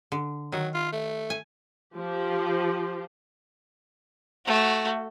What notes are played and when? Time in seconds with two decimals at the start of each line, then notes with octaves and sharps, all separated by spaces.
0.12 D3
0.52 D#3 F#3
0.74 F4
0.92 A3
1.30 G#5
1.95 F3 G4 C5
4.46 A3 F#4